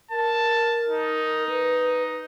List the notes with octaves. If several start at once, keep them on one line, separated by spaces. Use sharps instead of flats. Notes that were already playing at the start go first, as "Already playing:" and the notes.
A#4 A5
D#4
B4